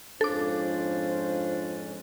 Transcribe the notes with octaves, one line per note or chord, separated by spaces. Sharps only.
F2 G#2 C#4 D4 F4 A4 C5 D6